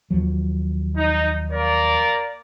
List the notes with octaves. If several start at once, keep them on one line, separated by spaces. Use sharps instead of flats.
D#2 F3 F#3
D#4
A#3 A#4 D5